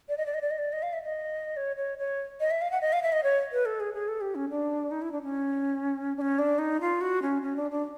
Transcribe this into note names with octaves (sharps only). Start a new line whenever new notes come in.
D5
D#5
D5
D#5
D5
D#5
D5
D#5
F5
E5
D#5
C#5
C#5
C#5
D#5
E5
F5
F#5
D#5
F5
E5
D#5
C#5
B4
A4
G#4
G#4
A4
G4
C#4
D4
D#4
E4
D4
C#4
D4
C#4
D4
D#4
F4
F#4
C#4
C#4
D4
D4